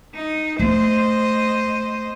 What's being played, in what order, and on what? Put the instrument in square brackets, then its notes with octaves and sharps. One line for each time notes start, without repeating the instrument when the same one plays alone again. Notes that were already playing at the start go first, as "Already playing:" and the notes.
[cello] D#4
[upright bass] A3 B3 [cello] C5 D#5